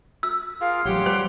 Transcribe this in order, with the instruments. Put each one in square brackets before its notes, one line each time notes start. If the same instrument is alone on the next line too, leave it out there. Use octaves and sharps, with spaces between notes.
[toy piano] E6
[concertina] F4 G#4 A#4 [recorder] F5
[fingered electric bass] A1 F#3 [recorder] G4 [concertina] C#5 F#5 C6
[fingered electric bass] G3 [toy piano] C5